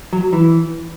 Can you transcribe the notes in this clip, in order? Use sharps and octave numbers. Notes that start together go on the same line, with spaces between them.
F#3
E3